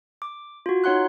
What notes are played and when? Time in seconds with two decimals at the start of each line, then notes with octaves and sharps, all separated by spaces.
0.22 D6
0.66 F4 F#4
0.84 D#4 C#5 F#5 C6 F#6